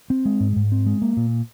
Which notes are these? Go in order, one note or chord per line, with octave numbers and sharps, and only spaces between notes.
C4
G#3
G#2
G#2
C4
G#3
A#3
A#2